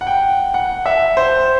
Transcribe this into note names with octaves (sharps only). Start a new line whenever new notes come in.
F#5
G5
F#5
E5
C5